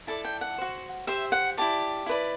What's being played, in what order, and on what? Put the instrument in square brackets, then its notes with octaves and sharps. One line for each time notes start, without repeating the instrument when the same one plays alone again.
[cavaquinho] E4 A4 D5 A5
G5
F#5
F#4 C5
G4 C5 E5
F#5
E4 G4 D5 A5
E4 B4 D5